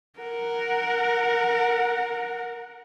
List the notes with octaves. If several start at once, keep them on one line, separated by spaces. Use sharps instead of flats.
A#4 F#5